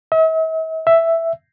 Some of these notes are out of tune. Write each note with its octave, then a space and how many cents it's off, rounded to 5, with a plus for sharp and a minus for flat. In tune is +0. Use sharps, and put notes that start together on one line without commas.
E5 -45
E5 +5